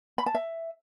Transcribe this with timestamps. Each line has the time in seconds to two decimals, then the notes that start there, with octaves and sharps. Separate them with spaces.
0.18 B5
0.26 A5
0.35 E5